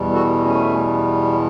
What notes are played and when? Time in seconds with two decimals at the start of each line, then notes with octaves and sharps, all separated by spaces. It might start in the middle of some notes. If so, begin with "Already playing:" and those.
Already playing: E2 B2 G3
0.13 F#4 A4
0.45 A3 C#4